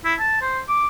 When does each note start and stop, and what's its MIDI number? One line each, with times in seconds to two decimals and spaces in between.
0.04 0.14 64
0.19 0.39 81
0.41 0.59 72
0.68 0.87 86